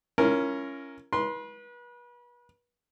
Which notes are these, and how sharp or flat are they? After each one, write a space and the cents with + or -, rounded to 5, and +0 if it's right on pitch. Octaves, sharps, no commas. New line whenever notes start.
C#4 +0 E4 +45 A#4 +0
B4 -35 C6 +0